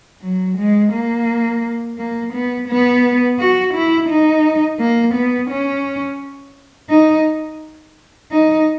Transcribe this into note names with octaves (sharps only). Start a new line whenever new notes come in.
F#3
G#3
A#3
A#3
B3
B3
F#4
E4
D#4
A#3
B3
C#4
D#4
D#4